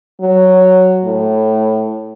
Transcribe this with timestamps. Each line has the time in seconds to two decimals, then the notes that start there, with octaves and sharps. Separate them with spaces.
0.21 F#3
1.04 A2